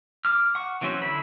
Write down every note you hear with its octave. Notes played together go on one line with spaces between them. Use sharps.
D6 F6
F#5 C#6
E3 F#3 C4 C#4 F#4
D3 E4 B5